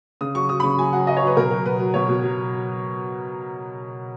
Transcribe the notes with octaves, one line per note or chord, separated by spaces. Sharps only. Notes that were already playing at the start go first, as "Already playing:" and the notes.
C#3 D#6
F#3 C#6
F#3 D#6
B5
C#3 C#6
F#3 G#5
F#3 F#5
F#3 D#5
C#5
F#3 B4
B2 A#4
F#3
B2 B4
F#3
B2 C#5
B2
F#3